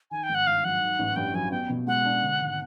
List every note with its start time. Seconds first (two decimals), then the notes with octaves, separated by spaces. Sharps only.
0.11 D#3 G#5
0.23 G5
0.29 G#1
0.35 F#5
0.46 G2 F5
0.64 F#3 F#5
0.82 D#3
0.99 A1
1.16 G2 G5
1.34 F#3 G#5
1.51 B3 G5
1.69 B2
1.87 G#3 F#5
2.05 D4
2.23 D3
2.40 G#1